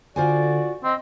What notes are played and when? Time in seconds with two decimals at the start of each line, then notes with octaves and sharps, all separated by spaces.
0.16 D3 F4 F#4 C5 D5 G#5
0.84 C4 D#5